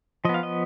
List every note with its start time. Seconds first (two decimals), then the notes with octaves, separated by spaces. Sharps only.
0.25 F3 D#5
0.29 B3
0.34 F5
0.43 D#5